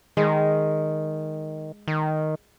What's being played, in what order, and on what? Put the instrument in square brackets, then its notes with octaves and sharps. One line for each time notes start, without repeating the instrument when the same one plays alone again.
[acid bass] D#3 [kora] G#3
[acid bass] D#3